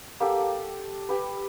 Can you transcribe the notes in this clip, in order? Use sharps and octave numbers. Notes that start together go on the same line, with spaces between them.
A#3 G4 A4 F#5
G5 A5
G4 B4